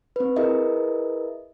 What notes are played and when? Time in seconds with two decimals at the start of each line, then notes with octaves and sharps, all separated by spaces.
0.16 C4 B4
0.36 E4 G#4 A#4 B4 D#5 E5